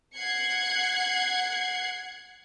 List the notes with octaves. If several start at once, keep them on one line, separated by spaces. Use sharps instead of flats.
F#5 F#6 G#6 C7 C#7